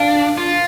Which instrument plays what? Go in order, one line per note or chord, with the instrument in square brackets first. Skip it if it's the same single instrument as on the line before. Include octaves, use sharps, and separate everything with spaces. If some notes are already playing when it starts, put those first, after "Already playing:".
Already playing: [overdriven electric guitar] D4 [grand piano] F5
[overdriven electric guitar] F4